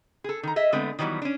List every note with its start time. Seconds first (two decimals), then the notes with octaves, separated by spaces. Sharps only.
0.24 G#4 A4
0.43 D#3 A#5
0.56 G#4 D#5 E5
0.72 D3 G#3 A3 B3 C4
0.99 D#3 E3 F#3 G3 B3
1.22 C#4 D4